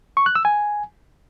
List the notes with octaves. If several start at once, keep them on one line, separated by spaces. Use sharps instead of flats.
C#6
F#6
E6
G#5